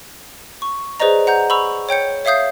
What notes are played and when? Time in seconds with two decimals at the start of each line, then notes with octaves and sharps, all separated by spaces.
0.62 C#6
1.00 G#4 B4 C5 D5 D#5 A#5
1.27 F#5 A#5 G6
1.50 B5 C#6 E6 F7
1.89 C#5 G5 G6 C#7
2.25 C#5 E5 F5 D#6 G6 C7